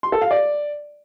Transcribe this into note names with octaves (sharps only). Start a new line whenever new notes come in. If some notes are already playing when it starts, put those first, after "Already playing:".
C6
A4
F5
D5